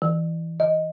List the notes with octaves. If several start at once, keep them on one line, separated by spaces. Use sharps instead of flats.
E3
D#5